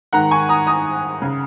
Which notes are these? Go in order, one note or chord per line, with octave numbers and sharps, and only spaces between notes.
G#2 D#3 F#5 A#5
G#5 C#6
A#5 D#6
A#5 D#6
C#3